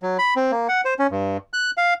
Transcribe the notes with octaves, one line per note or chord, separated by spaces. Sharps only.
F#3
B5
C4
A#3
F#5
C5
C#4
G2
F#6
F5